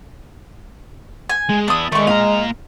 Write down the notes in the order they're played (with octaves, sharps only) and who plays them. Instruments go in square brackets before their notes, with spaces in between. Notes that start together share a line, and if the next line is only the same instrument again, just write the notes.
[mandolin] G#5
[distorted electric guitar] G#3
[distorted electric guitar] B3 E4 [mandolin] D4 D#6
[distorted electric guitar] D#3 D5 [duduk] G#3 [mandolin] A3 C#6
[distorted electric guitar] A#2 A#5 [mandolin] F5